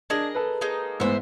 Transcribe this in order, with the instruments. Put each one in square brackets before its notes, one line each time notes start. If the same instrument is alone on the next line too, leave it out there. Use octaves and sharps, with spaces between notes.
[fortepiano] D4 [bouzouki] G#4 A#4 D#5
[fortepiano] A4 B4
[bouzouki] G#3 A#3 D#4
[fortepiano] A1 G#2 B3 [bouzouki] C5 E5